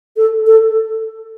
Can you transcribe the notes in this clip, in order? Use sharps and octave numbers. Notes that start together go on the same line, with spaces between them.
A4
A4